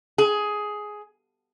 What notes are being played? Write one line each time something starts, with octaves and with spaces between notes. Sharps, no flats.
G#4